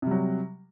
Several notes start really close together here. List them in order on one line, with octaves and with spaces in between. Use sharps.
C3 G3 F#3